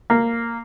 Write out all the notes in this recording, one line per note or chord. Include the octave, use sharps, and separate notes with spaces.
A#3